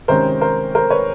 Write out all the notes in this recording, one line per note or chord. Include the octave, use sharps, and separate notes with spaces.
C3 D#3 G#3 C#4 A#4 C5
A#4 C5
A#4 C5
B4 C#5